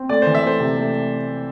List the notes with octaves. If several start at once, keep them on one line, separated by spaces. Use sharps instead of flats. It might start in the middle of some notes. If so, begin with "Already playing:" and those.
Already playing: C4
A3 D5
E3 C5
E5
A3 C5
C3
A3